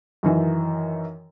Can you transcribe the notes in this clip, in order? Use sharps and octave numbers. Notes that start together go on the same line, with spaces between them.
F#2 D#3 E3